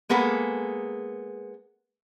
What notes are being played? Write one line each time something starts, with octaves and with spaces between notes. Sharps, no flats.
G#3 A#3 B3 G#4 A4